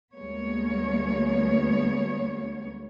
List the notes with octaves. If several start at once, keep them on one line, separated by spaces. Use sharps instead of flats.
D2 G3 G#3 A#3 B3 C#5